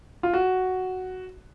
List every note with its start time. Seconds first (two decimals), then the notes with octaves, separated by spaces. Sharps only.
0.23 F4
0.34 F#4